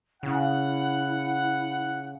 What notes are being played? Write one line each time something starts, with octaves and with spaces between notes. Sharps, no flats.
C#3 E4 F#5